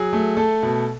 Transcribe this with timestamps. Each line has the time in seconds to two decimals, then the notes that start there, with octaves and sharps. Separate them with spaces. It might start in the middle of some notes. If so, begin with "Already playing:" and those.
Already playing: F#3 G#4
0.13 A3
0.37 A3 A4
0.63 B2